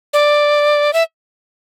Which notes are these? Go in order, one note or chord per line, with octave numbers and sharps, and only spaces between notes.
D5
E5